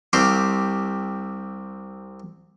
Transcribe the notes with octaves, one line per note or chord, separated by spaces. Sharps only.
C2 C4 G4 F5 D6